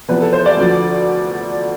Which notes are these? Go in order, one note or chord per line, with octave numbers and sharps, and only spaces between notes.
E2 C3 F3 B4
A4
C5
D5
D2 D3 F3